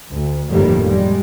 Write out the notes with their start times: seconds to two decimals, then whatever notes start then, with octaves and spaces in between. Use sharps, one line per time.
0.12 D2
0.50 G1 F2 A2 D#3 G3 A#3
0.85 G3 G#3